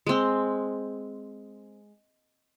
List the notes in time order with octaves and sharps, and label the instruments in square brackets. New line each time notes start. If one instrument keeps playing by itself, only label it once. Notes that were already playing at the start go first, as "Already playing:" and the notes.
[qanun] G#3 C4